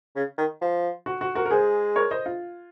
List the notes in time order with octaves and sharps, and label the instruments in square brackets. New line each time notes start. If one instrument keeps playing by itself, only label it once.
[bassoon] C#3
D#3
F3
[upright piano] F#4
F#4
F#4 A#4
A#4
[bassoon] G#3 [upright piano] G#4 C5
[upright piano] A#4 C#5
C5 D#5
F4